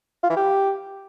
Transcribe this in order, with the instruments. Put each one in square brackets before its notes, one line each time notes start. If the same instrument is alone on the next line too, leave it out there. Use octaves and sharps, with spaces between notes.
[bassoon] F4
E3
G4